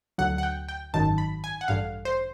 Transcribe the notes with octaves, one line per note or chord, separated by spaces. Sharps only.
D2 D3 F#3 F#5
F#5
G5
G5
G#1 F#2 D#3 F#3 A5
B5
G#5
F#5
A1 G2 D3 F5
C5